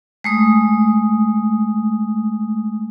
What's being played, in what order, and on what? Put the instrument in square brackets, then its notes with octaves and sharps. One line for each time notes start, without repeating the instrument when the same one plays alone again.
[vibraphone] G#3 A3 D#6